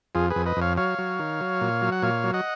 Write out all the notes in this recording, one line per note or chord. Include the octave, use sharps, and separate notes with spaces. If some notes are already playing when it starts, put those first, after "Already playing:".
F2 F4 G#4
G#4 B4
F2
B4 D#5
F2
C#5 F5
F#3 C#5 F5
F#3
D#3
F#3
A#2
F#3
F#5
A#2 C#5 F5
F#3
D#5 F#5